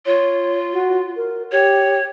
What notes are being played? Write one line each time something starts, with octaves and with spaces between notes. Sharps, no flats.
F4 C#5
F#4
A#4
G4 C#5